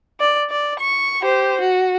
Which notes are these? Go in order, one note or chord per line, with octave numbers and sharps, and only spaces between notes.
D5
D5
C#6
G4 C5
F#4